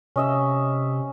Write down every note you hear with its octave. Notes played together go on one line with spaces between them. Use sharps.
C3 C#4 D#5 E5